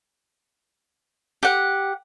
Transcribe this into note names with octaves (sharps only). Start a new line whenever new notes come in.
G4 F#5